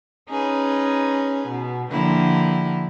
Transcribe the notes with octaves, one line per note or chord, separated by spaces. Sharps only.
C#4 D#4 G#4 B4
B2
D3 F3 A#3 E4 G4